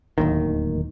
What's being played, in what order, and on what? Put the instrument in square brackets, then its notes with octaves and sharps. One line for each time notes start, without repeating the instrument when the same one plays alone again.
[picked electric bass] D1 D#2 D#3